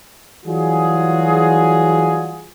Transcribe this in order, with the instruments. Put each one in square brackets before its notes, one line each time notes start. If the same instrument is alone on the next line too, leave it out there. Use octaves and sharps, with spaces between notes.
[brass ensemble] E3 F#3 G3 F4 F#4 G#4